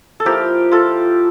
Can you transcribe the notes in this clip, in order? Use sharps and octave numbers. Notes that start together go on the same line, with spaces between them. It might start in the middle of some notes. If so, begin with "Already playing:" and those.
A4
F3 A#3 E4 G4 A#4
F4 A4